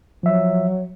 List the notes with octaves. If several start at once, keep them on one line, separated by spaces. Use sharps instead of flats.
F3 F#3 E5